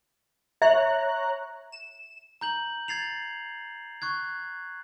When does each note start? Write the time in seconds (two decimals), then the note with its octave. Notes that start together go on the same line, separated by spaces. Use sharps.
0.62 C#5 E5 A#5 F#6
1.72 E7
2.41 A#5 G6 F#7
2.88 G#6 A6 C7 F7
4.02 C#6 F#6 G#6